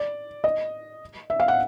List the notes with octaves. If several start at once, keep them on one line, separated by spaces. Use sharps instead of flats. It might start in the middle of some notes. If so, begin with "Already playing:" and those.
Already playing: D5
D#5
E5
F5
F#5